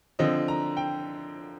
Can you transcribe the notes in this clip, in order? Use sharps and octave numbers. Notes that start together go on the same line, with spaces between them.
D3 F3 C4 D#5
A#5
G5